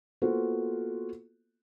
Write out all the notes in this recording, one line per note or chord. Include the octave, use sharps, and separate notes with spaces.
A#3 B3 F4 F#4 A4 C5